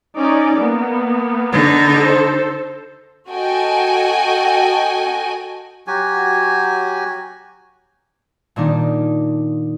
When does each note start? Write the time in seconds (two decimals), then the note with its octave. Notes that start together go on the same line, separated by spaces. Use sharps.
0.18 C#4 D#4 D5
0.59 A#3 B3
1.52 D3 D#4
1.99 A4 C5
3.30 F#4 A4 D#5 G5 G#5
5.87 F#3 F#4 G4 G#5
8.56 A#2 D#3 A#3 D4 D#4 D5